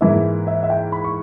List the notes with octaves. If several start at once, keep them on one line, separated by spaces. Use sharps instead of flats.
G#2 E3 A#3 E4 E5
E5
E5
G5
B5
C#6